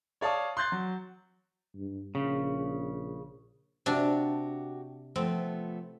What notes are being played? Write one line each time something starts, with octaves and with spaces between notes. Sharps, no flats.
C#5 D5 F5 A5 D#6
C6 F#6 G6 A6
F#3
G2
A#1 C#3
C3 D4 F#4 G4
F3 A3 B3 C4